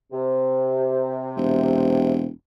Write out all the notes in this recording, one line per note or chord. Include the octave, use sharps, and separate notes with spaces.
C3
E1